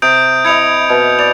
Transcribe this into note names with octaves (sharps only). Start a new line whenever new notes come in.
C3 D#6 G6 D7
E4 D#5 G#6 C#7 F7
B2
D5 F7